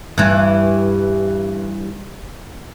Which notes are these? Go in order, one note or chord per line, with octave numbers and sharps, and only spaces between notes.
G2 E3